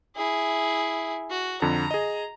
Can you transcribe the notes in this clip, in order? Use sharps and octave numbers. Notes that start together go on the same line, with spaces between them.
E4 G#4
F#4
F2 D3 A#5
G#4 D#5